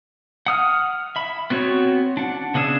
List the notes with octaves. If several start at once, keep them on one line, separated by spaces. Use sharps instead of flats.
F#5 D#6 F6
E5 B5
B3 C4 F#4 C#5
D4 F#5
C#3 B3 D4 G#4 E5